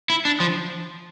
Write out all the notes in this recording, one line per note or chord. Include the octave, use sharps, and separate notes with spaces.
E4
D4
F3